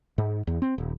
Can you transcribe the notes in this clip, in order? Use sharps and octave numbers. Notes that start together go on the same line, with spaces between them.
G#2
E2
C4
D#1